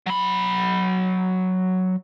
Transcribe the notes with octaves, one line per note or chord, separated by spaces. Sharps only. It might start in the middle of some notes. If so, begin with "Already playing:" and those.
F#3 B5